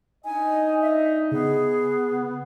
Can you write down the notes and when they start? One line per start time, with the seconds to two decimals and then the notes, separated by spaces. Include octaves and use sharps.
0.25 D4 D#4 D#5 G#5
0.82 E5
1.32 C#3 B3 G#4